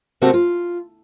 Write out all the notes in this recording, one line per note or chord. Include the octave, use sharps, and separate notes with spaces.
C3 A3 C4 F#4 A4 A#4
F4